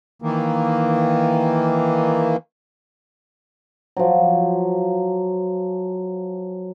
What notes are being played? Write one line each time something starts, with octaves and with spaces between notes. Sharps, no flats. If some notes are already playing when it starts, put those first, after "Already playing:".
D#3 E3 A#3
F3 F#3